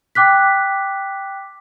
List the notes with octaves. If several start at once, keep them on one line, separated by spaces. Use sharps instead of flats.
G5 D6 F#6 B6